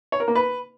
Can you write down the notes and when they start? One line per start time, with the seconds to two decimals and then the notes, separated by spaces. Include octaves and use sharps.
0.12 C#5
0.20 A#4
0.28 A#3
0.35 B4